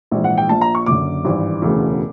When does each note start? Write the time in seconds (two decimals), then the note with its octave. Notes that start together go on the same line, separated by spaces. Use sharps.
0.11 A#1 G#2 E3
0.24 F#5
0.38 G5
0.49 A#1 A#2 A5
0.61 A#5
0.75 C#6
0.86 F#1 F#2 D3 D6
1.25 G#1 G2 E3
1.62 E1 D2 C#3 E3